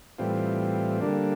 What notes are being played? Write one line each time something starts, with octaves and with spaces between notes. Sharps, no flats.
A2 E3 G3 C4 F4
D3 G3 A#3 D4